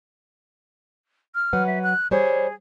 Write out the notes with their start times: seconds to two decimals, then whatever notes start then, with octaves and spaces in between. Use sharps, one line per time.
1.35 F6
1.53 F#3 B4 F#5
1.67 E5
1.84 F#6
2.11 G3 G#4 C5 C#5